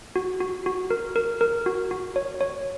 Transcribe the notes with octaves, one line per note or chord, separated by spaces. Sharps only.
F#4
F#4
F#4
A#4
A#4
A#4
F#4
F#4
C#5
C#5